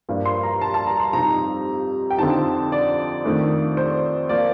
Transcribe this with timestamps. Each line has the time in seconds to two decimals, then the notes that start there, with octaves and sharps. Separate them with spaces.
0.09 G2 F3 A#3 D4
0.25 C6
0.43 A#5
0.61 A5
0.74 A5
0.87 A#5
1.00 C6
1.13 F2 C3 G3 C4 D#4 A#5
2.10 G5
2.18 F2 D3 F3 C4 D#4 A5
2.72 D5
3.25 F2 D#3 A3 D4
3.77 C5
4.29 F3 A#3 D5